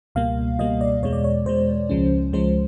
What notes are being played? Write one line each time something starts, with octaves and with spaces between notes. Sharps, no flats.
C#2 B2 G3 A#3 F5
C#2 B2 G3 A#3 D#5
D5
E2 B2 G#3 C#5
D5
C#5
E2 B2 G#3 C5
C#2 C#3 F3 G#3 C#4
C#2 C#3 F3 G#3 C#4 C5